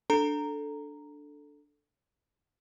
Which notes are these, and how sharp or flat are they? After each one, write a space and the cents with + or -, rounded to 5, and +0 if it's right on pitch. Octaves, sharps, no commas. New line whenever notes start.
D4 +0 A4 +0 A#5 -5